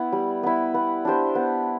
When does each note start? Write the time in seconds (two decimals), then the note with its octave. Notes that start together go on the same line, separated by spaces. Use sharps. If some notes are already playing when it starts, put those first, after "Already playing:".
Already playing: B3 E4
0.12 G3
0.43 B3 E4
0.74 B3
1.05 D4 G4 C5
1.35 B3